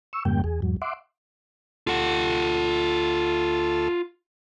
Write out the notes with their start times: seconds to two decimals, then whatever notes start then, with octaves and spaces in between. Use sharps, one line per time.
0.13 C#6 E6
0.25 F2 G#2 C#3 G3 A#3 G5
0.44 E2 G#4
0.62 E2 G#2 F#3
0.82 E5 F#5 C6 D6
1.87 D2 A3 F4 A4 F#5